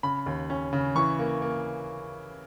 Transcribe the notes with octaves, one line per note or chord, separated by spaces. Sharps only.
C#3 B5
D#2
C#4
C#3
E3 C#6
A#3
A#3